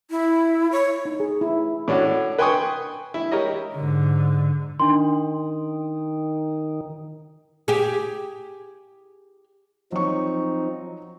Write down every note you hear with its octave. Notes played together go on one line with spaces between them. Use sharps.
E4
C#5
D#4
G#4
E4
A2 C#4 D4 F#4
B4 G5 G#5 C6 C#6 D#6
E4
G4 A#4 C#5 D#5
G#2 D3
D#3 D4 C6
G4 G#4
F3 F#3 C4 D#4 C#6